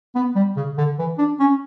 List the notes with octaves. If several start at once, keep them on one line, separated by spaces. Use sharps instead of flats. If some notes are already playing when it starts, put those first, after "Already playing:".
B3
G3
C#3
D3
E3
D4
C#4